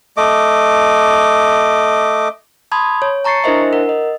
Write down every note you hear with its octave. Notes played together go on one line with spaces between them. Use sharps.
A3 D#5 D6
A5 B5 C6 D#6 G#6
C#5
A5 A#5 C#6 A6 C7 C#7
D4 E4 A#4 C5 D#5 E5
A#4 F#5
D#5